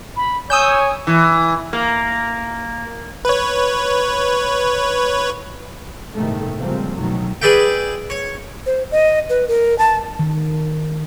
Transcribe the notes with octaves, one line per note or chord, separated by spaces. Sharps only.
B5
C#5 G#5 D#6 E6 G6
E3
A#3
B4 C#5
G1 A2 C3 D#3 G#3 A3
C#3 F3 G3 G#3 A#3 C4
C2 F2 B2 D#3 F#3 A3
G#4 B4 D5 E5 G5
C#5
C5
D#5
B4
A#4
A5
D#3